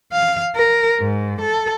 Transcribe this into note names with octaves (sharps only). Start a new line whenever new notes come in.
F5
A#4
G#2
A4